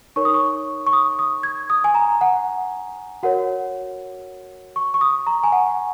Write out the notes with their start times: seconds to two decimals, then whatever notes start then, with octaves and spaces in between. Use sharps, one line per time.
0.16 D#4 A#4 C#5 C#6
0.25 D#6
0.34 C#6
0.87 C#6
0.93 D#6
1.19 D#6
1.43 G#6
1.70 D#6
1.84 G#5
1.95 A#5
2.21 F#5
3.23 F#4 A#4 C#5 F#5
4.76 C#6
4.94 C#6
5.01 D#6
5.27 A#5
5.44 G#5
5.52 F#5